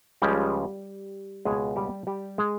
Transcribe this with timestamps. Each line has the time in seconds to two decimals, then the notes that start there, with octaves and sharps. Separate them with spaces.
0.22 C#2 C#3 F3 G3 G#3 G4
1.45 C#2 B2 G#3 G#4
1.76 G3 G4
2.07 G3 G4
2.38 G#3 G#4